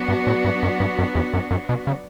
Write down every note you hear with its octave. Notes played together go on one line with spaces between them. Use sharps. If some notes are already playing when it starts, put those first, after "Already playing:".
Already playing: F#3 B3 D4 F#4
G2
A2
G2
F#2
G2
F#2
E2
F#2
F#2
B2
C#3